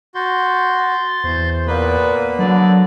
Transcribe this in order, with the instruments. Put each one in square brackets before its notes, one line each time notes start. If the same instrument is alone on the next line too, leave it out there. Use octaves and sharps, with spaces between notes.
[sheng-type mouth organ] F#4 [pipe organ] C6 G6 A6
[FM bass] E2 [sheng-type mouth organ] C5
[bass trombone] A#2 [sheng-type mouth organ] A#3 B3 B5 [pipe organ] B4
[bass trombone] D3 [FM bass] F#3 [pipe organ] D5